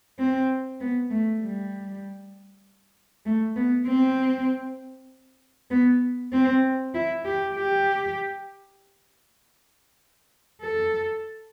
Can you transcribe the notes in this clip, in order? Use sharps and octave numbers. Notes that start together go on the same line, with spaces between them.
C4
B3
A3
G3
A3
B3
C4
B3
C4
E4
G4
G4
A4